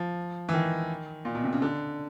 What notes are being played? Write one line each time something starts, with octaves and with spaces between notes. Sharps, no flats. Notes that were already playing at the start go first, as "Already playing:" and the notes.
Already playing: F3
E3
D#3
A#2
B2
C3
C#3
D3